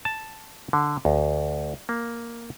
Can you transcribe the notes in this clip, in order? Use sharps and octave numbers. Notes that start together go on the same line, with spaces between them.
A5
D3
D2
A#3